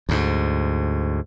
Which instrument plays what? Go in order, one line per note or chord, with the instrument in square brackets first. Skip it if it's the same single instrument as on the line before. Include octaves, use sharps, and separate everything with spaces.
[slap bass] D2 G#2